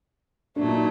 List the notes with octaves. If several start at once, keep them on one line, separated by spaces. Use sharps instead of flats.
A#2 F#3 A3 D4
D#4